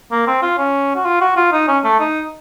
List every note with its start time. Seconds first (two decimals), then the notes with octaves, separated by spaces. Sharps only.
0.11 A#3
0.27 C4
0.42 F4
0.58 C#4
0.96 F#4
1.05 F4
1.21 F#4
1.37 F4
1.52 D#4
1.68 C#4
1.84 A3
2.00 D#4